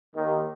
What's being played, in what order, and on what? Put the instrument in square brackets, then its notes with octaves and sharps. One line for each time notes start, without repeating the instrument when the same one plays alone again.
[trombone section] D#2 D#3